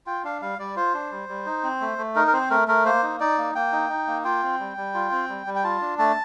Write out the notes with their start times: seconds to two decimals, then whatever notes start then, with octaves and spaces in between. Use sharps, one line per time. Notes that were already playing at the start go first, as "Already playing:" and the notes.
0.06 F4 G5
0.24 D4 F5
0.42 G3 F5
0.59 G3 D5
0.76 F4 C5
0.94 D4
1.11 G3
1.29 G3
1.46 D#4
1.64 C4
1.81 A3
1.98 A3
2.15 D#4 A#4
2.27 A#4
2.33 C4 C5
2.50 A3 A#4
2.68 A3 A#4
2.85 A#3 C5
3.03 D#4
3.20 D#4 D5
3.38 A#3
3.55 A#3 G5
3.72 D#4
3.90 D#4
4.07 A#3
4.24 F4 G5
4.43 C4
4.60 G3
4.77 G3
4.94 F4
5.12 C4
5.29 G3
5.47 G3
5.56 G5
5.64 F4 A5
5.82 D4
5.99 A3 A5